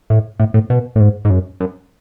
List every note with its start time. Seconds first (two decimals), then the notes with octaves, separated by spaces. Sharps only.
0.10 A2
0.40 A2
0.54 A2
0.70 B2
0.96 A2
1.00 G#2
1.25 G#2
1.30 F#2
1.60 F#2